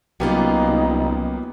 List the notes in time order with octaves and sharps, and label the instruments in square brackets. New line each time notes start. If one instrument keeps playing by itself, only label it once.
[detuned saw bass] C2 [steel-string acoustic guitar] F#3 C#4 F4 [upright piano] A#3 B3 G4 [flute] D#4